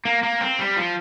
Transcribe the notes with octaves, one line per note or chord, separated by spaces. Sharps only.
A#3
A#3
C4
G3
F3